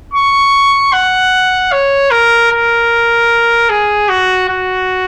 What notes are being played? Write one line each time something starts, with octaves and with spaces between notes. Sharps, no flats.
C#6
F#5
C#5
A#4
A#4
G#4
F#4
F#4